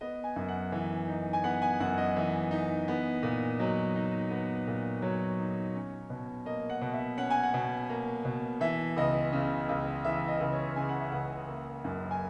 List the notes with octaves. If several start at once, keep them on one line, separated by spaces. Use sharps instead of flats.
B3 D#5
G#5
F#2
F#5
E3
D#4
G#5
B3 F#5
G#5
F#2 F#5
D#5
E3
D#4
B3
A#2
F#3 D#5
D#4
B3
A#2
F#3 C#5
D#4
C#4
B2
A#3 D#5
F#5
B2
E5
C#4 F#5
G#5
F#5
B2
A#3
B2
E3 E5
C#2 D#5
C#3
C#2
E3 E5
D#5
C#2
C#5
C#3 G#5
F#5
E5
C#2 F#5
A#3
F#2
G#5